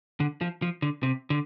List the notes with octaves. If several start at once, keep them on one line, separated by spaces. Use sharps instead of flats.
D3
F3
F3
D3
C3
D3